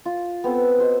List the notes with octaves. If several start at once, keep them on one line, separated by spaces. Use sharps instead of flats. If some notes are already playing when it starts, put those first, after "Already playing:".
F4
B3 C4 A4 E6
F#4 C5 D#5